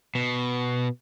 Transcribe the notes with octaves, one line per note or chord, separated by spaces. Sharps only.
B2